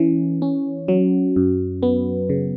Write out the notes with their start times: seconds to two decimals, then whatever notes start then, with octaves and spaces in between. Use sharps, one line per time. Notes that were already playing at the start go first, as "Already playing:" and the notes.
Already playing: E3 C#4
0.42 C#4
0.88 F#3
1.36 F#2
1.83 B3
2.30 C#3